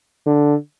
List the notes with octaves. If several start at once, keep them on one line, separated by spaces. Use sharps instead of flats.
D3